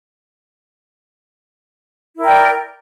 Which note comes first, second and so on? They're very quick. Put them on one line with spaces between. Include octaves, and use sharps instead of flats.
E4 A#4 G5 D5